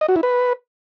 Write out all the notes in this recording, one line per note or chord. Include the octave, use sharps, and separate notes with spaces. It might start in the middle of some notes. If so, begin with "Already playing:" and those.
D#5
F#4
E4
B4